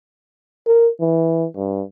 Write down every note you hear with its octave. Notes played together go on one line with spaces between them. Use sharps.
A#4
E3
G2